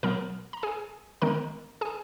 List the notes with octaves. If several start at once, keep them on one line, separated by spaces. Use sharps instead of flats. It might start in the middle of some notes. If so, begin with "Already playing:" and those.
B2 F#3 B3 A#4 A#5
A#5
G#4 G#5
D#3 G#3 B3 A#4 A#5
G#4 G#5